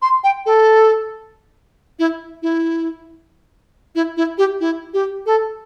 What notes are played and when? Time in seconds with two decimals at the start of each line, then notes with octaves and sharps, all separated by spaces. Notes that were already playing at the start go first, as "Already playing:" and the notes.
0.02 C6
0.24 G5
0.46 A4
1.99 E4
2.43 E4
3.95 E4
4.17 E4
4.38 G4
4.60 E4
4.94 G4
5.26 A4